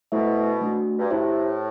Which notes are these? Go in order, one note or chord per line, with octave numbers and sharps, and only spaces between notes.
B2 A3 E4 A4 C5 E5
A3 D4 F#4
G2
A2 E4 G4 C5 E5